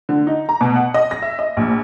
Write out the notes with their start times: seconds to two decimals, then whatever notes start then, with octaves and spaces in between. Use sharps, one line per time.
0.09 D3
0.27 D#4
0.49 A#5
0.61 B2
0.76 F#5
0.94 D#5
1.11 A#6
1.22 E5
1.39 D#5
1.57 A#1